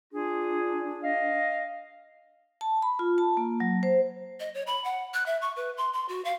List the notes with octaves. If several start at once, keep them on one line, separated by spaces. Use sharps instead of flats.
D4 F4 G#4
D#5 F5
A5
B5
F4
A5
A#3
F#3
C5
D#5
C#5
B5
F#5
F#6
E5
C#6
B4
C6
C6
F#4
F5